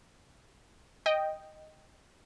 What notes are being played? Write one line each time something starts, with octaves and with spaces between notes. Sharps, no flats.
D#5 G5